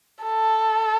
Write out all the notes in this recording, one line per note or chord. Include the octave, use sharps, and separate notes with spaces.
A4